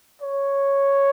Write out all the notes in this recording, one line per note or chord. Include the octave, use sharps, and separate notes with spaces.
C#5